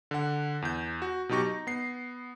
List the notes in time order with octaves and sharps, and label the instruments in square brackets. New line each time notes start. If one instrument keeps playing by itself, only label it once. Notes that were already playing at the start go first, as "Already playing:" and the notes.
[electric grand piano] D3 F#5
E2 G6
F#4
B2 F#3 D#4 G4 C#6 A#6
D#4
B3 C7